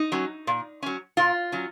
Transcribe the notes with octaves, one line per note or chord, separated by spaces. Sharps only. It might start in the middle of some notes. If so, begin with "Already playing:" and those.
Already playing: D#4
F#3 C#4
A#2
F#3 C#4
A#2 F4
F#3 C#4